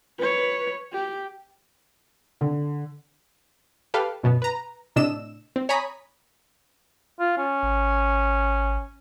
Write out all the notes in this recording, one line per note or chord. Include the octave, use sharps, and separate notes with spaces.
B4 C#5
G4
D3
G4 A4 B4 F5
F#2 B2 B3
B4 A#5
A2 C3 D4 D#5 E6 E7
C4
C#5 G#5 A#5 B5 D#6
F4
C#4
G#1